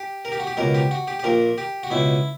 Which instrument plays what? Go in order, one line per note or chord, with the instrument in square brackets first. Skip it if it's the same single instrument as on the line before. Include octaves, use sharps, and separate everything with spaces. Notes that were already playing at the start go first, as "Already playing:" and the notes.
Already playing: [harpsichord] G4
A#4
G4
F#4
G4
C#2 B2 A#4
G4
F#4
G4
G4
A#1 A#2 A#4
G4
F#4
C#2 B2 E4